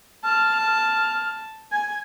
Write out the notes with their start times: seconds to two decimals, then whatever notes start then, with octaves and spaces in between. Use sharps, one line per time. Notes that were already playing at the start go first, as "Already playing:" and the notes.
0.24 A5 F6
0.61 F6
1.72 G#5 G#6